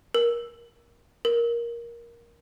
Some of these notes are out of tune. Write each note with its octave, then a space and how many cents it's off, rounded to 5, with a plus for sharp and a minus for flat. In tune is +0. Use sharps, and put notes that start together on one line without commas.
A#4 +20
A#4 +10